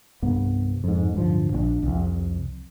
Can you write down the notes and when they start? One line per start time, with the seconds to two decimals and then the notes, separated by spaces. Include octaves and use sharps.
0.22 C2 G2 B3
0.84 F2 G#2
1.14 D1 G2 F3
1.53 A#1 C4 D4
1.83 C2 F2